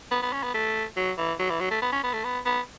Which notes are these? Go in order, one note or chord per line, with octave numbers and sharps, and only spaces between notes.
B3
B3
C#4
B3
A3
F#3
E3
F#3
E3
F#3
A3
B3
C#4
B3
A3
B3
B3